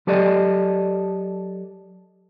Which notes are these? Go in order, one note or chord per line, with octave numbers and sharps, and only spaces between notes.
F#3 G4 A4 D5 D#5